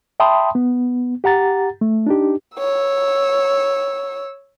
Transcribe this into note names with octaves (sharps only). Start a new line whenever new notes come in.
E5 G5 A5 B5 C6 D#6
B3
G4 F#5 A#5 A6
A3
D4 D#4 G4
C#5 E6